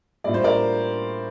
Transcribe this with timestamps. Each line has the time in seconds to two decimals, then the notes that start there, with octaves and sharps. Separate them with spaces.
0.24 A2 G3 A#3 D4 F4 D5
0.34 C5
0.44 A#4 D5